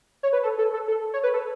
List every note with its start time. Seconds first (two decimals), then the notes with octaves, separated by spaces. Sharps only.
0.23 C#5
0.33 B4
0.43 A4
0.58 A4
0.73 A4
0.88 A4
1.14 C#5
1.23 B4
1.34 A4